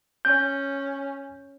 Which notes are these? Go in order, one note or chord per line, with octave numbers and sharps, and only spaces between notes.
C#4 G6